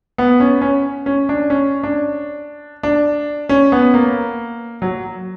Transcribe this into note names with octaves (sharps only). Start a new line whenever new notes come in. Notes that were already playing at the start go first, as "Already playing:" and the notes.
B3
C#4
C#4
C#4
D4
C#4
D4
D4
C#4
B3
A#3
F#3